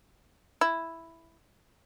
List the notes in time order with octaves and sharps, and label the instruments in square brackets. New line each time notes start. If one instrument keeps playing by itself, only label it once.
[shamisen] E4